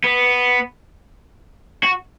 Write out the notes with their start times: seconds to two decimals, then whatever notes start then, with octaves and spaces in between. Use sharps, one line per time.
0.04 B3
1.83 F#4